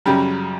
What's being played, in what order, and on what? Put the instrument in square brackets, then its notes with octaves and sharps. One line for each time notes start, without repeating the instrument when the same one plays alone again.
[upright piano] F#2 C#3 F#3 G3 G4